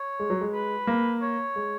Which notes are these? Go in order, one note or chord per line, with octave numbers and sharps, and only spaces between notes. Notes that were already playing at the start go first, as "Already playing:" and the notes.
Already playing: C#5
G#3
F#3
G#3
B4
A#3
C#5
G#3